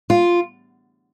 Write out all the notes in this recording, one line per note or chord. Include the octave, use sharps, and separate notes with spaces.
F4